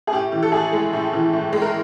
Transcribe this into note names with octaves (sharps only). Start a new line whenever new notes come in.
G#4
A2 G4
E3
A4
A2 G#4
G#3
A2
E3
A2
G#3
A#4